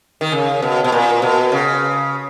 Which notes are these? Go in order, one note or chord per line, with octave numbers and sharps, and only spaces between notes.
D#3
C#3
B2
B2
A#2
B2
C#3